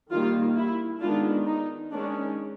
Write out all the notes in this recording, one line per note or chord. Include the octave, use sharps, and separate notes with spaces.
D#3 G3 A#3 F4
E4
D#3 G#3 B3 D4 F4
D#4
D#3 G#3 C#4 D4